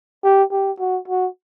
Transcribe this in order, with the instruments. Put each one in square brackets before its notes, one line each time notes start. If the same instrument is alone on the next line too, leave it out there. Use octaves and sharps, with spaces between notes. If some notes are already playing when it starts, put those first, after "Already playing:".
[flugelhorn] G4
G4
F#4
F#4